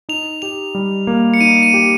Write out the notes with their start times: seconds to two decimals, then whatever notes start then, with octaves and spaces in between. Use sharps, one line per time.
0.09 D#4 F7
0.42 G4 F7
0.75 G3
1.07 A#3
1.34 C#7
1.41 D#4 D#7
1.63 D#7
1.74 G4